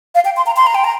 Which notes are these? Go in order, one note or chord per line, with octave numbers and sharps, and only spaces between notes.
F5
G5
C6
A#5
C6
A#5
G5
A#5